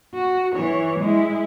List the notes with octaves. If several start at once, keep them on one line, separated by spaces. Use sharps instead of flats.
F#4
E3 C#5
G#3 E4